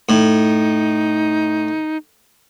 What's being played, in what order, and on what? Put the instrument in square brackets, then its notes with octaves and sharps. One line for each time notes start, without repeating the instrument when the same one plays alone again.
[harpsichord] A2 [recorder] D#4